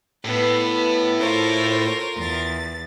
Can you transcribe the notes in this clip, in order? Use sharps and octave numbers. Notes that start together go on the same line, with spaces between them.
A2 B3 B4
F4 A4 A#4 C5 C#5
E2 A6